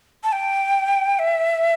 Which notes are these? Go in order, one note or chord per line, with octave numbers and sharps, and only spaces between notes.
A5
G5
E5